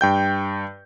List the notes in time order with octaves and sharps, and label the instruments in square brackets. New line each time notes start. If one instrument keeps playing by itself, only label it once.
[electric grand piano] G2 G5 G6